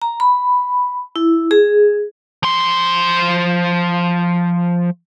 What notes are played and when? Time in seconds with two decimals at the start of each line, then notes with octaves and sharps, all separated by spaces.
0.02 A#5
0.20 B5
1.16 E4
1.51 G#4
2.43 F3 C6